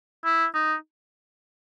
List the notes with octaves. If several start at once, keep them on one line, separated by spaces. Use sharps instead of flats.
E4
D#4